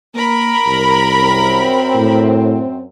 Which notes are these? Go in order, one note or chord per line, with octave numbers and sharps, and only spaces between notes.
A#3 A#4 B5
C2
F#2 C4
A2